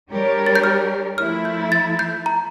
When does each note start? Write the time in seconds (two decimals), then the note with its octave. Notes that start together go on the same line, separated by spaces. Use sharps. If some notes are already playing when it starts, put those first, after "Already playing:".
0.10 G3 D4 G4 A#4 C#5
0.46 A6
0.55 G6
0.64 F6
1.18 F3 A3 E4 F6
1.45 G6
1.72 A6
1.99 G6
2.26 A#5